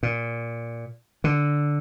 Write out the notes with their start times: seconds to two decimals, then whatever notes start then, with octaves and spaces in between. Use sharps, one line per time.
0.03 A#2
1.24 D3